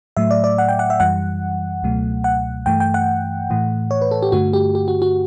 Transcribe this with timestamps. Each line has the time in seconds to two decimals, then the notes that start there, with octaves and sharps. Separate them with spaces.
0.17 A2 F#3 A3 E5
0.31 D5
0.44 D5
0.58 F#5
0.69 G5
0.79 F#5
0.90 E5
1.00 F#2 E3 G3 F#5
1.83 C#2 B2 F#3 A3
2.24 F#5
2.66 G2 E3 A3 G5
2.80 G5
2.94 F#5
3.50 A2 E3 A3
3.91 C#5
4.02 B4
4.11 A4
4.22 G4
4.32 G2 D3 A3 F#4
4.53 G4
4.75 G4
4.88 F#4
5.02 F#4